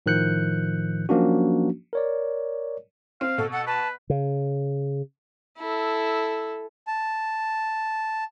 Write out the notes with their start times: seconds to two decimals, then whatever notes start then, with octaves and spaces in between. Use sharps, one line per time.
0.06 A2 D#3 F3 F#6 G6 C#7
1.09 F3 F#3 A#3 C#4 D4 F#4
1.93 A#4 C#5 D5
3.21 C4 F5
3.38 B2 A4
3.52 A4 F#5
3.67 B4 A5
4.10 C#3
5.58 E4 A4
6.87 A5